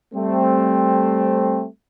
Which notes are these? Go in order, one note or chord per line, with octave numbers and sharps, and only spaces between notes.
G3 A3 C4